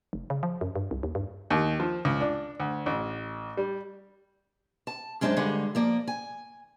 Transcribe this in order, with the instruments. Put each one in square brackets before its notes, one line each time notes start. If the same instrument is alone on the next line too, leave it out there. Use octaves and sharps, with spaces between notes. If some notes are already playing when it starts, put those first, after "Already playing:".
[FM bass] F1
C#3
F3
F#2
G2
C2
D#2
G2
[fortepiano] D#2
F3
C#2
D4
D2
A1
G3
[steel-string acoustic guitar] A5
F#2 G#3 D4 G4 C5 A5
G2 D3 G#3 F#5
F3 A#3 D5
G#5